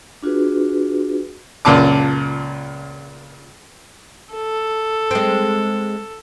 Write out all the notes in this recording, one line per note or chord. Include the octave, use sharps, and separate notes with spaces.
D4 F4 F#4 G#4 B4
C#2 F#2 A#2 A5 D6
A4
G#3 C4